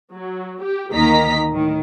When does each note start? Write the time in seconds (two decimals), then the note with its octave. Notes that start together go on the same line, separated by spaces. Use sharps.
0.12 F#3
0.62 G4
0.92 D2 D#3 A#3 D#5 A#5 B6
1.50 A2 D#3